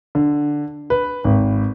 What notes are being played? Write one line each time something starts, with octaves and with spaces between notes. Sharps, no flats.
D3
B4
G#1